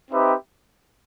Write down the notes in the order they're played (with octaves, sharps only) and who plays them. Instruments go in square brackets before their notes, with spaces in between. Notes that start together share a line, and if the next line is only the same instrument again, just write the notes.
[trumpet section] C4 D#4 G4 B4 E5